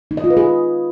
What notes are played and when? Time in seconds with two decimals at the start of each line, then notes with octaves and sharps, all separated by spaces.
0.11 D#4
0.17 D#5
0.24 F4
0.30 B4
0.37 G#4